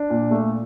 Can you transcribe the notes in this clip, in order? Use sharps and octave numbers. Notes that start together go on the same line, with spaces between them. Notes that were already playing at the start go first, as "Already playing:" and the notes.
Already playing: D4
A#2
A3